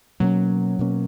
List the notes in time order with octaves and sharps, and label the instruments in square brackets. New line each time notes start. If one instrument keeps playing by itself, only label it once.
[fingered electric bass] B2 A#3 C#4 [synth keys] F#3
[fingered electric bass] B2 A#3 C#4